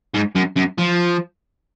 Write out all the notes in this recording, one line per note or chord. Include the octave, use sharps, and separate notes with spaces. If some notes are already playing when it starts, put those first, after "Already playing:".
G#2
F#2
F#2
F3